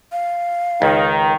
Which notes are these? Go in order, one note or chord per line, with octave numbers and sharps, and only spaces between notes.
F5
C#2 D#3